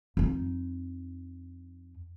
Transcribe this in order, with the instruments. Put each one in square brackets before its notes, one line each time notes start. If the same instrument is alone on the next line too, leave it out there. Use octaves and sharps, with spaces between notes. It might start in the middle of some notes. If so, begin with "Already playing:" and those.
[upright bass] F2 D#4